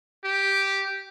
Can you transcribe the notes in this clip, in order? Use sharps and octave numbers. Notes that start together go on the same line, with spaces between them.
G4